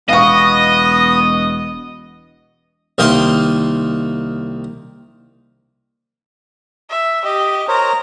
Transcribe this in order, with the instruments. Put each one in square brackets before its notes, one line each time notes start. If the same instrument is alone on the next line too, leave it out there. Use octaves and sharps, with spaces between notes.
[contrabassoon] E1 [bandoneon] B3 [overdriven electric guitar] D#5 [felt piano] F5 C#6
[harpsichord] C2 D#3 A#3 D#4 C6
[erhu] E5
[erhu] G4 [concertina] D#5
[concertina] A#4 C5 C#5 [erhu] A#5